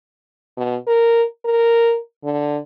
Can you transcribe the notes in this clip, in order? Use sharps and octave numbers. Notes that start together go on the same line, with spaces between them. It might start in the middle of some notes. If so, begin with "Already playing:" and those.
B2
A#4
A#4
D3